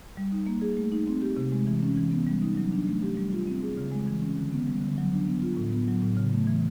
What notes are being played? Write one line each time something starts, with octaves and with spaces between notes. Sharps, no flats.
G3
D#4
A#3
G#4
A3
D#4
C4
G4
C3
G#3
E3
C#4
E3
B3
G3
D#4
F#3
D4
A3
G4
G3
F4
C4
G#4
C#3
G#3
E3
C#4
D3
B3
G3
D3
F#3
D4
B3
F4
A2
B3
F#3
A2
C#3
A3
E3